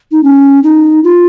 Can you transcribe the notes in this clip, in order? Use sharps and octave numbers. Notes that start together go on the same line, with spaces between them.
D#4
C#4
D#4
F4